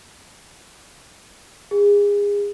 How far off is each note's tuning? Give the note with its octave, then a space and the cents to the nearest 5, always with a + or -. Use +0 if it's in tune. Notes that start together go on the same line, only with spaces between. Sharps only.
G#4 -30